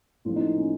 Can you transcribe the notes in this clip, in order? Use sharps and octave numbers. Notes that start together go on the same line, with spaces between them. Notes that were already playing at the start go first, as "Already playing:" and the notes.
A1 A2 F3 F4
D#4
C#4
C#4